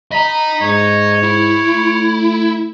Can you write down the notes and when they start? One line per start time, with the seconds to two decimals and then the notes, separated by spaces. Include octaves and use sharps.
0.12 D#5 A#5 B5
0.61 G#2 C#5
1.23 E4
1.73 A3